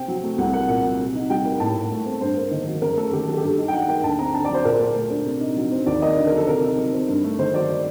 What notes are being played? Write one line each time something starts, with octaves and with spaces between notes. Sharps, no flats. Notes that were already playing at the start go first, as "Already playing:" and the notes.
Already playing: C3 C4 G5
F#3
A3
C2 F#5
A#3 F#5
A#2 F#5
F#3
C3
D#4
G3 G5
A#3
A2 A5
A2
A3
C4
G2 C5
A#3
D#3
F#3
F#2 A#4
A3 A4
D#3 G4
F#3 A4
G4
G2 A4
D#4
G5
F#3 F#5
A#3 G5
D2 A5
C4 A#5
D3 A5
D5
F#3 C5
A#2 A#4
A#2
A3
D4
C3
D#4
F#3
C4
D#2 D5
A#3 D#5
D3
A#4
F#3
A4
C3 A#4
D#4
F#3
C4
G2
A3
D#3 C5
F#3 D5